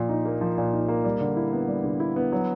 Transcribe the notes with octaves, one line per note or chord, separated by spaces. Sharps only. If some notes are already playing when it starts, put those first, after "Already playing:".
Already playing: A#2 F3
D#4
A#3
F3
A#2
D#4
A#3
G3
D3
E4
B3
G3
D3
E4
B3
F#3